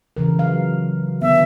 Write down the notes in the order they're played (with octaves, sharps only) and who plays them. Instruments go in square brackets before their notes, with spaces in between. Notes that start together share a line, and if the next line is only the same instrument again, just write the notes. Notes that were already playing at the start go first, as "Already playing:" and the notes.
[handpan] C#3 E3 A#4
F#3 F5
[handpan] D3 B3 [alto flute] E5